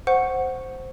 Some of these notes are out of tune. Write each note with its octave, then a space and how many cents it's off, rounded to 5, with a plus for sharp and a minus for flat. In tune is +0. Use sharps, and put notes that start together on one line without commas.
C5 +0 F#5 +0 C#6 +0